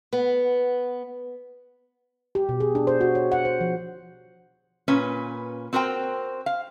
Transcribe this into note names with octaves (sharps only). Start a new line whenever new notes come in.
B3
G4
B2
G#4
D4
C5
F#4
C#5
F#5
C5
F3
A#2 C#4 B4
C4 F#4 A#4 C5 G5
F5